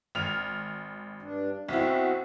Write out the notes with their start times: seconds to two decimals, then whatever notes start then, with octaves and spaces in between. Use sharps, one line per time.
0.15 G#1 F6 F7
1.22 G2 D4
1.69 B1 C4 E4 F#4